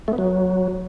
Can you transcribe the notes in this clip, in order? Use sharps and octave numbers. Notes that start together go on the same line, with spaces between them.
A3
B3
F#3